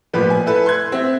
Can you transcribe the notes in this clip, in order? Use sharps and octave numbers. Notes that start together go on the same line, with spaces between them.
A1 A#2 F3 B4
G#5
E4 A4 B4
C6 F#6 G#6
C4 E5